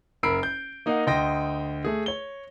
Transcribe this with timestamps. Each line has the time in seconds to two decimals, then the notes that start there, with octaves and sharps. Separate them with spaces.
0.23 F#1 A#4 B5 E6 C7 D7
0.43 G6
0.86 A#3 D#4 D#5 F5 F#5
1.07 D2 D#5 G5 C6 A#6
1.84 A3 G#4
2.06 C#5 G7